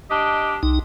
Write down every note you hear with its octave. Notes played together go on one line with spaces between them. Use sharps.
D4 G4 D#5
C2 D#4